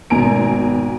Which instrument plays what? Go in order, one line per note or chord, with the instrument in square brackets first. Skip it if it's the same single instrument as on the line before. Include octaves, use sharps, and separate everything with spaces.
[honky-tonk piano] G#1 B2 G#5 A#5 D7